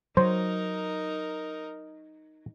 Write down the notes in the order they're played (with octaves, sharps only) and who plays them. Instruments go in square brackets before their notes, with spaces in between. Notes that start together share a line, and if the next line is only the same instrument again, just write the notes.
[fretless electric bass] F#3 [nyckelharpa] D#4 A#4 [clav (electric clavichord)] C5